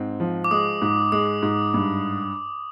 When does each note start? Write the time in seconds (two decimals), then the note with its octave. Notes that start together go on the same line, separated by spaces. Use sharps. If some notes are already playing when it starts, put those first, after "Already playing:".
Already playing: G#2 C4
0.20 F3
0.44 D6
0.51 G#3 D#6
0.82 G#2
1.12 G#3 D#6
1.42 G#2
1.74 G2